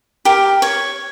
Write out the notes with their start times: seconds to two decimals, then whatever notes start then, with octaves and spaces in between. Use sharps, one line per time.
0.25 G4 A#4
0.62 C#5